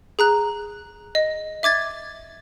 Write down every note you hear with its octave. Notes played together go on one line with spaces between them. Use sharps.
G#4 A#5 F#6
D#5
E5 D6 G#6 A6